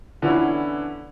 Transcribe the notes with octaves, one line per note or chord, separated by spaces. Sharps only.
D3 E3 B3 C#4 E4 B4